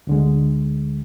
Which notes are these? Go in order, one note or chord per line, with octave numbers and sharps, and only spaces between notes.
D2 D3 G#3